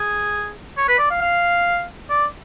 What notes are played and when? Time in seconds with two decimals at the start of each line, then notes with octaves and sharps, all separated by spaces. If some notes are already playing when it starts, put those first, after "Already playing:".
Already playing: G#4
0.77 C#5
0.88 B4
0.99 D5
1.10 F5
1.21 F5
2.10 D5